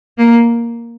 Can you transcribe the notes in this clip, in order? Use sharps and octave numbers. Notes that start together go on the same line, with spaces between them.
A#3